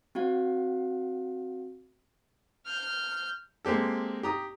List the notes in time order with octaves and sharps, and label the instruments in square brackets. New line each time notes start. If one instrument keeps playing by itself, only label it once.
[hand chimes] C4 F#4 F5 F#5
[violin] F6 G6
[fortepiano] G#3 A#3 C4 G4 A4
G4 A#5 D#6